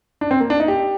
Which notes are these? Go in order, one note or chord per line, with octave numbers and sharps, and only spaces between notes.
D4
C4
A#3
D4
D#4
G4